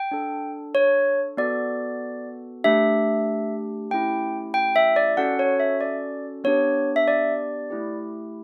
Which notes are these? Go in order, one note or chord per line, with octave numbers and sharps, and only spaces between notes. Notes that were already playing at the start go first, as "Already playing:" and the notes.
Already playing: G5
D4 A4
C#5
B3 F#4 A4 D5
A3 D4 G4 E5
A3 C#4 E4 G4 G5
G5
E5
D5
C#4 F#4 A4 F#5
C#5
E5
D5
B3 D4 G4 C#5
E5
D5
A3 E4 G4